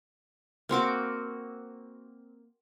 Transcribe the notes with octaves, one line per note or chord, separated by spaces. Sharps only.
A#3 C4 F#4 D6